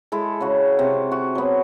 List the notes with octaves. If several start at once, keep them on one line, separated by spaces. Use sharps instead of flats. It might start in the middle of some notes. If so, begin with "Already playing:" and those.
G#3 E4 A4
C#3 F#4
C3
F#4
F#3 B3